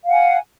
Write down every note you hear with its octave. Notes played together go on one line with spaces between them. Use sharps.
F5 F#5 G#5